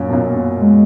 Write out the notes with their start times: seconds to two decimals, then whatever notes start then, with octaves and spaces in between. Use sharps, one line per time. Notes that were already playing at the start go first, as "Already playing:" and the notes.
Already playing: F#2 A#2
0.08 B2
0.13 F#2 A#2
0.60 G#3